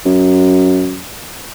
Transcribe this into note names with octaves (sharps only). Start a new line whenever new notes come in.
F#2